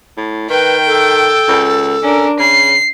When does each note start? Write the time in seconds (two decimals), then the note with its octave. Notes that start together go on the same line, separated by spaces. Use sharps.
0.17 A2
0.50 D#3 B4 G5
0.87 A4
1.48 C#2
2.03 C#4 D4 A#4
2.39 C#3 C7